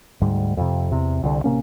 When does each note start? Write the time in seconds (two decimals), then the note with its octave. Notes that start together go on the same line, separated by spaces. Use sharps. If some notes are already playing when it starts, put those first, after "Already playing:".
0.21 D2 G#2 G3
0.57 F2 C3
0.92 E2 C3
1.23 C2 D3
1.44 A1 C3 A#3 C#4